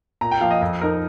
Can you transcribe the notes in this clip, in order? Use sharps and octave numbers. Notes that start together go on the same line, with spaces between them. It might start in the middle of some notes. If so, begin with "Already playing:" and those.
A#2 A#5
G5
F3 A#3 F5
D#5
F2 D#5
F3 D#4 A#4